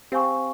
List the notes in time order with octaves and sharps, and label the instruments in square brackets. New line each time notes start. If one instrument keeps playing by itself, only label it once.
[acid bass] C4 [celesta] G4 C5 F5 G#5 C#6